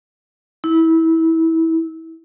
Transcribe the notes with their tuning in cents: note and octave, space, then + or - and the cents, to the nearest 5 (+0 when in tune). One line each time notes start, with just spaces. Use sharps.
E4 -20